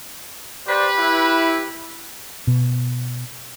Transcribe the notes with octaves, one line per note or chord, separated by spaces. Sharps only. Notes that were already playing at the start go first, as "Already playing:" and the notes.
G4 B4 C5 D5
E4
B2